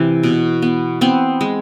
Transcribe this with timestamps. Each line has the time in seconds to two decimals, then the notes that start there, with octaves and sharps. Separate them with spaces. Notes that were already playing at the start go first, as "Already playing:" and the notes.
Already playing: C3 E3
0.23 B2
0.62 B3
1.01 B3 C4
1.41 G#3